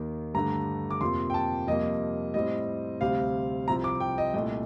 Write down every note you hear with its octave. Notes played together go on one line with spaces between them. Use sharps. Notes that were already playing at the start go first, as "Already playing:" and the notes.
Already playing: D#2 D#3 A#3
G2 D3 A3 A#5
D6
F2 C3 F3 A#3 C6
G5
A5
F2 C3 G3 A#3 D#5
A2 G3 C4 D#5
D2 C3 G3 C4 F5
C2 C3 F3 C4 A#5
D6
G5
D#5
C2 A#2 A3 D#5